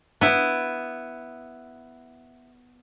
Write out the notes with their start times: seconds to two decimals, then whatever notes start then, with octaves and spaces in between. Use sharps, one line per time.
0.21 B3 E4